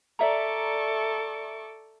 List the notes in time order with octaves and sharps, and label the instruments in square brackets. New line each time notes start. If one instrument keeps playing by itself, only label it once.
[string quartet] A4 C#6 D6 [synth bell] D5 E5 A#5